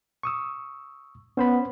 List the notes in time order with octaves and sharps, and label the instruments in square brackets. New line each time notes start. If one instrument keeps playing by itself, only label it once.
[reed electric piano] C#6 D#6 E6
[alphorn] B3 [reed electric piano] C#4 C5 B5